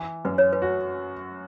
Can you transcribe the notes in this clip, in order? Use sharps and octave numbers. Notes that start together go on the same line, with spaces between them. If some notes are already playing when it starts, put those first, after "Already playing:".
Already playing: E3
F#2 B4
C#5
B4
F#4